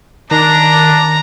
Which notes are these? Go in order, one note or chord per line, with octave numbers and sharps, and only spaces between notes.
D#3 D4 A#5